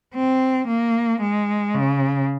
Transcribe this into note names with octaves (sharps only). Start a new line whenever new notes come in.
C4
A#3
G#3
C#3